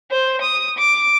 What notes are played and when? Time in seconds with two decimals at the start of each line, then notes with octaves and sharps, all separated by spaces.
0.11 C5
0.41 D#6
0.78 D6